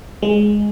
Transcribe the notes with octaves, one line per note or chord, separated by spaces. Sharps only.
G#3